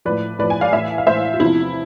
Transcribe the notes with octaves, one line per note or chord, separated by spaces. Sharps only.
A2 F3 B4 D5
A2 B4 D5
F3
G#5
D5 F5
A2 E3 E5 G#5
F5
A2 E3 C5 E5
F4
E2 C3 F3 E4